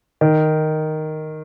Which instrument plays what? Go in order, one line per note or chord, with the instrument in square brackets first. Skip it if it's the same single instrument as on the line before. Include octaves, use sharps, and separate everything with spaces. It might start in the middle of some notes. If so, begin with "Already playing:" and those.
[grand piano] D#3